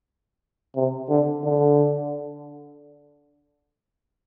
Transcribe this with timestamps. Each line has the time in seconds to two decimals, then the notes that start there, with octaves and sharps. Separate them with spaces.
0.76 C3
1.10 D3
1.44 D3